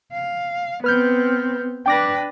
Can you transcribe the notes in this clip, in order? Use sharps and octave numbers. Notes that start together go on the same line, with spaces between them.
F5
B3 C4 B4 F6 G6
D4 B4 G5 D6 A#6